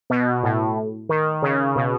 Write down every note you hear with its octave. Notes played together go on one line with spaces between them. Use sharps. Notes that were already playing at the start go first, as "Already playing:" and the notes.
B2
A2
D#3
C#3
B2